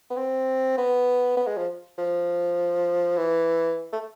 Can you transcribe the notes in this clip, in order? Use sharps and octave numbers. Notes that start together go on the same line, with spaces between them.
B3
C4
B3
B3
G#3
F3
F3
E3
A3